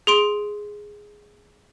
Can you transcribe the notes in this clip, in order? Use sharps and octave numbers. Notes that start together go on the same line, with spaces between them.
G#4 C6 D7